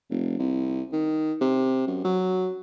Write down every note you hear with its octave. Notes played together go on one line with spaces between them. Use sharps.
F1
C2
D#3
C3
F#2
F#3